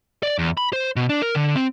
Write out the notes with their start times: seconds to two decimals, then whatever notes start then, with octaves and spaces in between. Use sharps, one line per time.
0.23 D5
0.38 E2
0.57 B5
0.73 C5
0.96 B2
1.09 D4
1.22 A#4
1.35 D3
1.55 C4